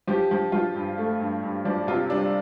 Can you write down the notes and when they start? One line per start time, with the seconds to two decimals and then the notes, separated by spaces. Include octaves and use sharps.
0.07 F3 G4
0.31 F3
0.52 F3 F4
0.75 G2
0.98 A3
1.20 G2
1.43 G2
1.65 F3 D4
1.87 C3 F4
2.10 G3 D4